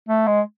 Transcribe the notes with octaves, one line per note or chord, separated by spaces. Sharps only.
A3
G#3